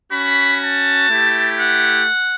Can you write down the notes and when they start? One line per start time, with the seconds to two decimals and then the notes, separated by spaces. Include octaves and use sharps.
0.12 C#4 F#4 B5
0.61 A5
1.10 A3 E4 G4
1.58 F#5